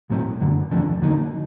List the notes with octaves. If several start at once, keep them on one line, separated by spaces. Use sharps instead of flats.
B1 A2 F#3 A3 C4
F#2 D3 F#3
E2 C3 F3 A3 D4
D3 F#3 A#3 D#4